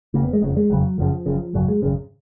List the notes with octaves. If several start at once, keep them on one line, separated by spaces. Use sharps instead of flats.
F1 F2 C#3 A#3
B3
G#3
F#1 F2 C#3
G#3
F#1 F2 C#3 F#3
F#1 F#2 C#3 F3
F#1 F#2 C#3
G#1 F#2 C#3 F#3
G#3
G#1 F#2 C#3